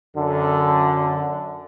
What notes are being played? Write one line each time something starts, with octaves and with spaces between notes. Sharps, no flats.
F#2 D3